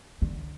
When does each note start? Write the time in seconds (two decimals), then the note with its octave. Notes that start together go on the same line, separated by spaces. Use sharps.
0.22 D3